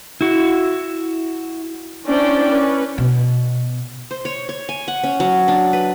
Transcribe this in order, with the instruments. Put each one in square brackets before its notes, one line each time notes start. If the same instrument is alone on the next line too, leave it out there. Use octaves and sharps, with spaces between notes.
[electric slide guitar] E4 F#4
[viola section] C#4 D4 E4 C5 D5 G5
C#4 B4
[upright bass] B2
[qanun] C5
C#5
C#5
G#5
F#5
C#4
F#3
D4
B4